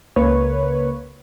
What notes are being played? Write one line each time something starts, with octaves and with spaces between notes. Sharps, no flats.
C#2 A#3 B4 C#5